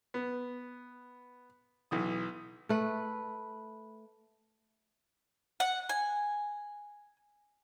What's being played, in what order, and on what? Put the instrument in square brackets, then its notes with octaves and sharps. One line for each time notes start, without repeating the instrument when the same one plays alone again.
[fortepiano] B3
B1 E3 D#6
[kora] A3 B4
[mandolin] F#5
G#5